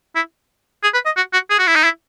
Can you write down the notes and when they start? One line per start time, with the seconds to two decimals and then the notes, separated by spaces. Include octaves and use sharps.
0.16 E4
0.83 G#4
0.94 B4
1.06 D#5
1.17 F#4
1.33 F#4
1.50 G#4
1.59 F#4
1.67 E4
1.76 D#4
1.84 E4